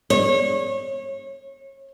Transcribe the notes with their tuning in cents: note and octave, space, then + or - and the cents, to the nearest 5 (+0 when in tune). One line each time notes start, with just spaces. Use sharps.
C#5 -30